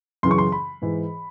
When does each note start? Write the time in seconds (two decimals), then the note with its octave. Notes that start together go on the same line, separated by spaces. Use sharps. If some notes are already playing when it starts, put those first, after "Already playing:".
0.23 F#2 C#3 E3 C6
0.31 C#6
0.38 C6
0.52 B5
0.82 G#2 E3